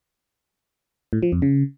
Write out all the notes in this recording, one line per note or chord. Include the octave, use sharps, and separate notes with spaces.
A2
F3
F2
C#3